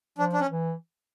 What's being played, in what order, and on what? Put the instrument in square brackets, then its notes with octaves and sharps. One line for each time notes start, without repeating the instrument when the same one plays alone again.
[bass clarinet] F3 [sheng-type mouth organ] D4
[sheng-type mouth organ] D4
C#4
[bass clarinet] E3